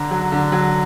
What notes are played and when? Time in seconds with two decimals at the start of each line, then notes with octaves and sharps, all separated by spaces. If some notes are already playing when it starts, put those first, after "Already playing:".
Already playing: D3 A#5
0.11 F#3
0.32 D3
0.52 F#3